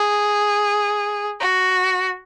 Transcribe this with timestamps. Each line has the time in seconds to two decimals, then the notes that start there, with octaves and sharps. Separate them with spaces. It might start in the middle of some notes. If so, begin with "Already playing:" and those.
Already playing: G#4
1.40 F#4